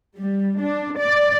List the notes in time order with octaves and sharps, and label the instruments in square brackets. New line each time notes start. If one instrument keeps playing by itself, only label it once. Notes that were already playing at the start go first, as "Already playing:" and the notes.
[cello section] G3
D4
D5